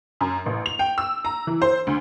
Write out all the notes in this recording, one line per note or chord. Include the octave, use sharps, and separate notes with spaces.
F#2
A1
F7
G5
E6
A#5
E3
C5
D2